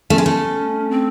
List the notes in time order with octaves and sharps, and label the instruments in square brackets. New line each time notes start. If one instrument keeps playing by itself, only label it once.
[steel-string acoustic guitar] A3 [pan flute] C#4
[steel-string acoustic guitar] G#3
A3
[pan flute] C4